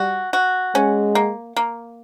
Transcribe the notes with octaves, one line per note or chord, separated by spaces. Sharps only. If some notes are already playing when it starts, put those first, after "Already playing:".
Already playing: G3 F#4
F#4
G#3 C#4
A#3
A#3